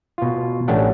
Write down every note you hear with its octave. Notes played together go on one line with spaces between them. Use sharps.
B2 F4
A1 A3 C#4 D4 G4 F#5